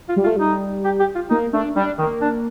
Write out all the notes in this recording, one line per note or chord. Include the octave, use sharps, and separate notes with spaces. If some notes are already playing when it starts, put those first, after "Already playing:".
F4
G3
F4
A3
G3 D#4
G4
G4
F4
A#3 D#4
A3 D4
G3 D4
D#3 A#3
D4